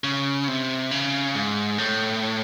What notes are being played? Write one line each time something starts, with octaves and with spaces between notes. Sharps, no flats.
C#3
C3
C#3
G#2
A2